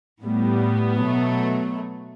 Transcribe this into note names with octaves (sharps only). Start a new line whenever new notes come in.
A2 G3 B3
B2 F#3 A3